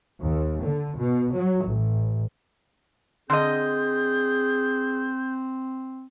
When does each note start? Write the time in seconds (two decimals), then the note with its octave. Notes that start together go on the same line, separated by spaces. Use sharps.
0.22 D#2
0.65 D3
0.98 B2
1.34 F#3
1.68 A1
3.30 D3 C4 G#4 D#5 G6